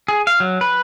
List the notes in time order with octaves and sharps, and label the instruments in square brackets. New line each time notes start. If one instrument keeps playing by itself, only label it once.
[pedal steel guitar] G#4
F5
F#3
B4